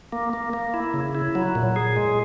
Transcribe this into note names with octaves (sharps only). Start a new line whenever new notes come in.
A#3
A#3
A#3
E4
C#3
E4
F#3
A#2
G#4
G#3